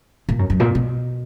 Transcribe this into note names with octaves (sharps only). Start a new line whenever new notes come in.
A#2
F#2
F#2
A#2
B2